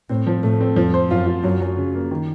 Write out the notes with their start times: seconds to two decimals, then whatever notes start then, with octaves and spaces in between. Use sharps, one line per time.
0.09 A2 C4
0.27 F3
0.43 A2 A3
0.61 C4
0.76 F2 F3
0.94 C5
1.10 F#2 F4
1.27 F4
1.43 F#2 F#3
1.60 F#3
1.77 C#3
1.95 A#3
2.11 D#3